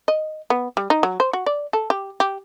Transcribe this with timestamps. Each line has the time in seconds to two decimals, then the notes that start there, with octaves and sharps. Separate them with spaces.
0.08 D#5
0.50 B3
0.77 G3
0.90 D#4
1.03 F#3
1.20 C5
1.33 F#4
1.46 D5
1.73 A4
1.90 G4
2.20 G4